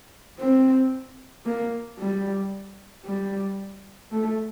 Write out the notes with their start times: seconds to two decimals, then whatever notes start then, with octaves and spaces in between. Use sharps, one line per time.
0.39 C4
1.45 A#3
1.99 G3
3.05 G3
4.11 A3